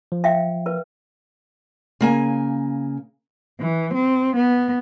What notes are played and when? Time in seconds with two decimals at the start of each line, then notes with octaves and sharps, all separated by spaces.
0.12 F3
0.24 E5 F5 G5
0.66 A#4 B4
2.01 C#3 A#3 G#5
3.60 E3
3.94 C4
4.36 B3